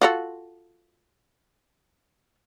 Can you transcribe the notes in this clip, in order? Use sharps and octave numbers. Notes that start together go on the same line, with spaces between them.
F4 F#4 A4